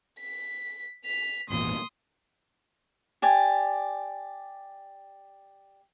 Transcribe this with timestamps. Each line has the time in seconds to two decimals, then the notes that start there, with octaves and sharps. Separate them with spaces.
0.20 B6
1.05 B6 F7
1.50 G#1 E2 A#2 C6 D#6
3.22 G4 D5 G#5